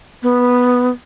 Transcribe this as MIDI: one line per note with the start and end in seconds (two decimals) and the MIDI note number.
0.23 0.90 59